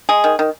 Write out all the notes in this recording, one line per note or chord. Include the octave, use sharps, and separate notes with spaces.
G#3 G#4
D#3
D#3